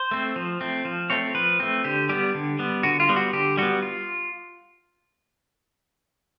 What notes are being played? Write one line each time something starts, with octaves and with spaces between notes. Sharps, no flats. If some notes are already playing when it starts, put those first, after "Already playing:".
Already playing: C5
A3 C4
F3
A3 C4
F3
A3 C4 C#5
F3 B4
A3 C4
D3 G4
G3 B3 G4
D3
G3 B3
D3 F#4
F4
G3 B3
F#4
D3 G4
G3 B3 F#4
F4